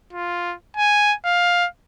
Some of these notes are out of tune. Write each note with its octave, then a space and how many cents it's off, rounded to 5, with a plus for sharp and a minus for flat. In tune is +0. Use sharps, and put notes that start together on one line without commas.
F4 +0
G#5 +0
F5 +10